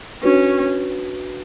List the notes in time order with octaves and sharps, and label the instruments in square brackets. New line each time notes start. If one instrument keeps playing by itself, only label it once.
[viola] C#4 [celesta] D4 F#4 B4